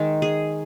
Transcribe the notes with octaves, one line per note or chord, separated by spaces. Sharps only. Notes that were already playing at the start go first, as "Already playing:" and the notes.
Already playing: D#3 G#3
G#4